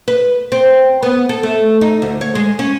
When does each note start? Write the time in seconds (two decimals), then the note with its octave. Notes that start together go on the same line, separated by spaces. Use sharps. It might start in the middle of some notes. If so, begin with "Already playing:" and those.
0.08 B4
0.52 C4
1.03 B3
1.29 A4
1.43 A3
1.81 D#4
2.02 D2
2.21 C#5
2.35 G#3
2.59 C#4